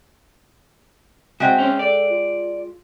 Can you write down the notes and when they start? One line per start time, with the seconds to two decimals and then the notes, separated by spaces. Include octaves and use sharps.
1.40 G#3 C4 F#4 E5 G5
1.58 C#4 C5
1.79 A4 D5
2.09 F4